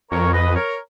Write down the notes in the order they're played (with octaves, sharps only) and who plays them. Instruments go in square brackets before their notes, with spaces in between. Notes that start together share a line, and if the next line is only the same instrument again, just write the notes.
[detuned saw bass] F2 [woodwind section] A#4 C#5
[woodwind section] B4 D#5
A#4 C#5